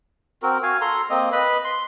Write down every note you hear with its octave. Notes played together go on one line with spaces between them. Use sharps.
C4 F#4 A#4
F#4 F5 G#5
A4 A#5 C6
A#3 C4 D#5
B4 D#5 B5
C6